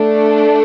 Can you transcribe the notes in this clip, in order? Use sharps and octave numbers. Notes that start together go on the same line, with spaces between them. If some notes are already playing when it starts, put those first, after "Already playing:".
Already playing: A3 D4 A4